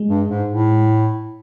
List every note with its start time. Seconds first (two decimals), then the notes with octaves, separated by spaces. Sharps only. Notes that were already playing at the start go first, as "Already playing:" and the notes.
Already playing: G#3
0.08 G2
0.29 G#2
0.50 A2